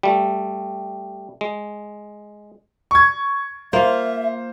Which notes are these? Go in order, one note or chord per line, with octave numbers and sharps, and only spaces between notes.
G3 A3
G#3
C#6 G#6
A#3 F4 C5 E5